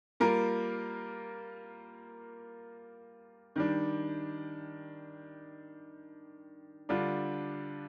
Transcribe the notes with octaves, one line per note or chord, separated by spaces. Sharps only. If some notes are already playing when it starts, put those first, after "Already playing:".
G3 A#3 F4 A#4
D#3 G3 D4
D3 G3 D4 F4